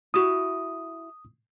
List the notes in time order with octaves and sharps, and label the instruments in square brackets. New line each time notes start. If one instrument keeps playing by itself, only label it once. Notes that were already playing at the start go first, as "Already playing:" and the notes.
[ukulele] E4 F#4 [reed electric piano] D#6